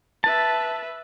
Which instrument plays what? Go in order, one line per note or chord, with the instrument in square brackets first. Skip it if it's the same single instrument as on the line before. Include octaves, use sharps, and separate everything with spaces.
[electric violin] B4 E5 [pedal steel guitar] A5